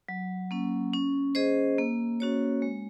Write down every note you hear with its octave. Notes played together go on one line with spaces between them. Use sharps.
F#3
A#3 C#4
C#4
G#4 C5 D#5
A#3
C#4 F#4 C#5
G#3